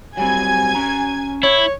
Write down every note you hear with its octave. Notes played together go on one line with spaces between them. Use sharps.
F#3 G3 C4 G#5 G#6
C#4 A#5
E4 C#5